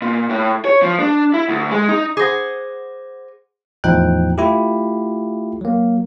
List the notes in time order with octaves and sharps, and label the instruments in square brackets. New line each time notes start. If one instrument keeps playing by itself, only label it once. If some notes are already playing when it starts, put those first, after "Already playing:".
[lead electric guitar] A#2
A2
C#5
F3
D4
E4
D2
G#3
D#4
[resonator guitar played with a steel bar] G#4 C5 F#5 [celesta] D6 A#6
[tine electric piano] E2 A2 F3 D#4 G5 F#6
A3 E4 F4 G4
F#3 A#3